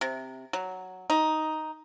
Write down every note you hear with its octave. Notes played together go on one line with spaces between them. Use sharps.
C3
F#3
D#4